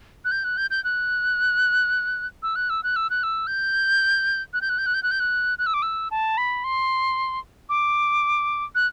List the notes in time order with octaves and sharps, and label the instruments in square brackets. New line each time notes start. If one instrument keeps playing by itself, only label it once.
[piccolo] F#6
G6
F#6
G6
G6
F#6
E6
F#6
E6
F#6
E6
F#6
E6
G6
F#6
G6
F#6
G6
F#6
G6
F#6
G6
F#6
F#6
E6
D6
E6
A5
B5
C6
D6
F#6